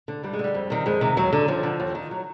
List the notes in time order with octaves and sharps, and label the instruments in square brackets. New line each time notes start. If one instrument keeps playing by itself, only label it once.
[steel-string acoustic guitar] D3
G2 G3
G#3
D3 G3
F2
C3 D#3
F2 G#3
C3 D#3
D#2 F#3
D3
D#2 F3
D3
D#2
D#3
F#3